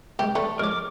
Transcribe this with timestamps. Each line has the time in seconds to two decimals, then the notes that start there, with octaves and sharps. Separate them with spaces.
0.19 C2 G#2 G4
0.35 E3 A3 D4
0.59 F2 G#2 A#4 C#5 D6